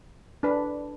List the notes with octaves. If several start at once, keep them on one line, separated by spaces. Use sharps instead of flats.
D4 B4